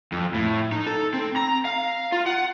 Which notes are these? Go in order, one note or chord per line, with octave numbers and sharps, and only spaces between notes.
F2
A2
D#4
A4
C4
A#5
F5
F4
F#5